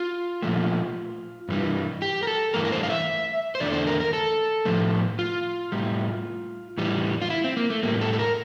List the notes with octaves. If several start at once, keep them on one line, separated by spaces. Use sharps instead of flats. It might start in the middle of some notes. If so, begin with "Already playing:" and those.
Already playing: F4
A#2 F3 A3
G2 E3 G3
G4
A#4
A4
G2 E3 A3 A#4
A#4
C5
F5
E5
C5
E2 D3 A3 D5
C5
A#4
A#4
A4
A2 F3 A3
F4
A2 G3
A2 E3 G3
F4
E4
C4
A#3
A3
A2 G3 A#3
A4
A4
A#4